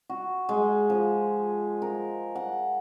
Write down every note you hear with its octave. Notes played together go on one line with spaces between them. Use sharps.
F#4
G#3
F3
A#4
F#5